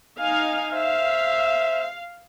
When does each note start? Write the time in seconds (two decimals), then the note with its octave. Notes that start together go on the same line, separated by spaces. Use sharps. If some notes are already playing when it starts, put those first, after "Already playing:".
0.19 D#4 F5 G#5
0.73 C5 E5 F5